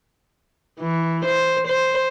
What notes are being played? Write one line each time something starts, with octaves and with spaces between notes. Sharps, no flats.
E3
C5
C5